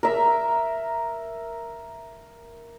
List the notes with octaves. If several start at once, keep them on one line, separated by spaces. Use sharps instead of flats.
A#4 E5